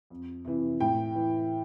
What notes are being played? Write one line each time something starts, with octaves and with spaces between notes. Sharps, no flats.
F2
C3 E3
A2 G5
E3